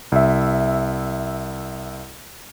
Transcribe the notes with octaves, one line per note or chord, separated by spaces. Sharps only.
C2 E5